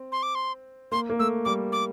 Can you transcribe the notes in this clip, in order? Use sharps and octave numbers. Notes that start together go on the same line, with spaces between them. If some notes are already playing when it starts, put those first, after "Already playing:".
Already playing: C4
C6
D6
C6
A#3 C6
A#3
A3 E6
G3 D6
D6